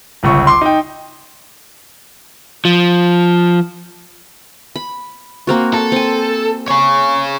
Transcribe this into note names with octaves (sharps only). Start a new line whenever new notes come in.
G1 C#2 C#6
C6 D6
D#4 G5
F3
B5
A#3 C4 F#4
A4
C4 G#5
G#4 C#5